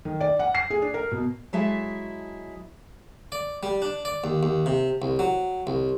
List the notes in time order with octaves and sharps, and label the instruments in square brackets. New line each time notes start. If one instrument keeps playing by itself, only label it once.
[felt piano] D#3
D5
F#5
C7
G#4
D4
A#4
B2
[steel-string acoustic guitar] F#3 G#3 E4 E5 A5
[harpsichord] D5
G3
D4
D5
D#2
D#2
C3
C2
F#3
C2